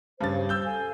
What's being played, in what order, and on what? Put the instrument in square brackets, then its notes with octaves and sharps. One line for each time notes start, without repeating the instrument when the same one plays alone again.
[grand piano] G2 C#3 A6 [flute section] C5 F5
[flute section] C5
[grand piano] E6 G6 G7
[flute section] A4 F5 G#5